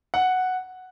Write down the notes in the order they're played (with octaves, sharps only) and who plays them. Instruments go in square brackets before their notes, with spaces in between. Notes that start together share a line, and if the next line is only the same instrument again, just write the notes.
[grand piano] F#5